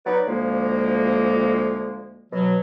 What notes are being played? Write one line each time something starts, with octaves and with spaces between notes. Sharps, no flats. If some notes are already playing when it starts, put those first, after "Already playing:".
F#3 B3 D#4 B4 D5
D2 F3 G#3 A#3
B2 F#3